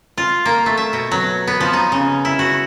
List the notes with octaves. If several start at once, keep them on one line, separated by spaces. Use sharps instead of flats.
F4
A#3
A3
E5
B2
F#3
B3
F3
D#4
C#3
E4
F#4